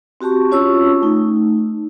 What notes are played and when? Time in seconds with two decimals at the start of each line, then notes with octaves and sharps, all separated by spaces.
0.21 C4 F#4 G4 A5 C#6
0.51 C#4 F4 C#5 A5 C#6 E6
1.02 A3 D#4